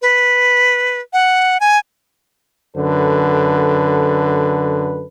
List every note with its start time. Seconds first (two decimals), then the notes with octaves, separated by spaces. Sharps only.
0.02 B4
1.13 F#5
1.60 G#5
2.76 F#2 D3 A4 B4